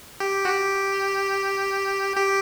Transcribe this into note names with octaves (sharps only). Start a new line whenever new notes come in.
G4
F#4
G4
G4